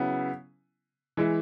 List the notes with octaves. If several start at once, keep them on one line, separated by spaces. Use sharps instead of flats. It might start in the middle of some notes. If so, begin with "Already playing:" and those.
Already playing: C#3 F#3 B3 E4
E3 G#3 E4